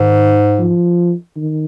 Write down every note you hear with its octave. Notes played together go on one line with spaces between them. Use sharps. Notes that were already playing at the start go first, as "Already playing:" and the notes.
Already playing: G#2 D#3
F3
D#3